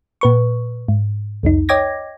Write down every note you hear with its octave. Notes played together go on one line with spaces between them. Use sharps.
A#2 B4 C#6
G#2
C2 F2 D#4
C#5 D#5 G5 D6 G#6 A#6